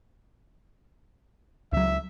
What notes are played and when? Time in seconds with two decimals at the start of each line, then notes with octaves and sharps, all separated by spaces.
1.73 C#2 F#3 E5